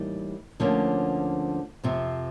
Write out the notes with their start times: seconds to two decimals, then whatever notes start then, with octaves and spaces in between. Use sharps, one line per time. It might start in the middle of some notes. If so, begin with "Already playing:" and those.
Already playing: A2 E3 G3 A#3 D#4
0.60 D2 D3 F3 A#3 C#4
1.84 F2 C3 F3